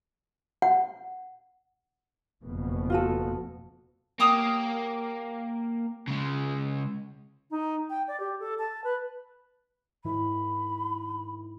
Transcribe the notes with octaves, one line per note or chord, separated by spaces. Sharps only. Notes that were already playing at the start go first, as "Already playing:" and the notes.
F#5
F#1 F2 B2
F4 F#4 A4
A#3 G4 C#5 D#6
C#3 G#3
D#4
G5
D5
G4
A4
A5
B4
G#2 D#3 E4 B5